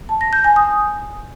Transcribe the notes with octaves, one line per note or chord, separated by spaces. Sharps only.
A5
A#6
G6
G#5
D#6